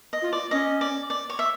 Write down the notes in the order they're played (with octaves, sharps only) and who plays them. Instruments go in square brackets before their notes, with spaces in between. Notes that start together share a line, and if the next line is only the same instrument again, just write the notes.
[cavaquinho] D#5
[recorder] F4
[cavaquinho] D5
[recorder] C#4 [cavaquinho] D#5
[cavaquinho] D5
D5
C#5
E5